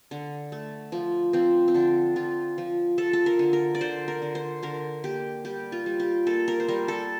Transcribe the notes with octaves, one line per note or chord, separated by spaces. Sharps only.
D3
A3
F3
F3 C4
C4
D3 D4
F3 F4
F3
F3 A4
A4
A#4
D3
A#4
D5
D3 C5
A#4
D3
C5
D3 A#4
A#3 G4
G3 G4
F4
G3
G4
A#3 A4
A#4
C5
G3 A#4
A4